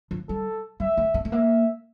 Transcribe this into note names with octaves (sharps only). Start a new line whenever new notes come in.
F3
G3 A4
G3 E5
A3
A3
A3
A#3 E5